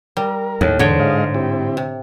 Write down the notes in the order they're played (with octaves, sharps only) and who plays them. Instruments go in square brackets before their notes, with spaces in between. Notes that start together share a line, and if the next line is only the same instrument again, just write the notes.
[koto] G3 [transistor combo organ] A#4
[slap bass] D#2 [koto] A2
[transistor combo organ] E2 [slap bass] G#2 [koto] D3 C#5
[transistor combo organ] G#3 D#5 F5
C4 E4 G4
[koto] C3